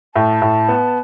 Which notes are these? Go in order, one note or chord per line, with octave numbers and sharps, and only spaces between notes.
A2 A5
A2
B3